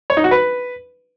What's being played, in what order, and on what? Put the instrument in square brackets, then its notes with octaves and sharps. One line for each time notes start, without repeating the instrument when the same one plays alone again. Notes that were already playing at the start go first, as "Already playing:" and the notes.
[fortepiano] C#5
D#4
F#4
B4